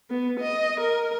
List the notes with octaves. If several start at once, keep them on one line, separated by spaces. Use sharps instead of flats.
B3
D#5
A#4